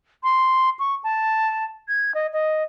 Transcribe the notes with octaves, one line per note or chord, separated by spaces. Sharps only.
C6
C#6
A5
G#6
D#5
D#5